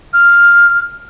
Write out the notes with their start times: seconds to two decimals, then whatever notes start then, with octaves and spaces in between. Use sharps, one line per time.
0.13 F6